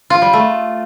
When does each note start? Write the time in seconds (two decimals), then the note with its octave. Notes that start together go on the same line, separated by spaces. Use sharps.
0.10 F4
0.22 G3
0.33 A3